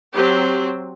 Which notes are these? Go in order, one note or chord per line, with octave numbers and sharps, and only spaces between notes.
F#3 C4 G4